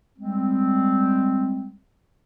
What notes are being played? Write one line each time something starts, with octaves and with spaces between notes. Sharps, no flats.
G3 G#3 C4